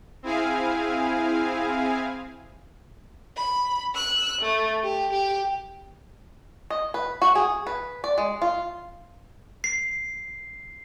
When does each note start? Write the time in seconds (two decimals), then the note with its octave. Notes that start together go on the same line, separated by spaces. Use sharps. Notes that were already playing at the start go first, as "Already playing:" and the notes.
0.23 C4 E4 G#4 F5 G#5
3.37 B5
3.95 E6 F#6
4.41 A3
4.84 G4
5.13 G4
6.70 D#5
6.94 B4
7.22 F#4
7.35 G#4
7.67 B4
8.04 D5
8.18 G#3
8.42 F4
9.64 C7